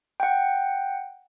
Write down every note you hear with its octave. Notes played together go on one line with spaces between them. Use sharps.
F#5 G5